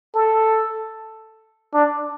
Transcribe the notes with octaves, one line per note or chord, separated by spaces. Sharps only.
A4
D4